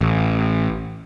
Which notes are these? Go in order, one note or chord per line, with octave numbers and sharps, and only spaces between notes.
A1